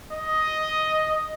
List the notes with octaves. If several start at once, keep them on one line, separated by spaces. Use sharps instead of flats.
D#5